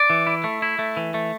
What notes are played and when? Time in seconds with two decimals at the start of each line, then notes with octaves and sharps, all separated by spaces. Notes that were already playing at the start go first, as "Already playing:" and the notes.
Already playing: D5
0.10 E3
0.27 E4
0.44 A3
0.62 E4
0.79 A3
0.97 E3
1.14 A3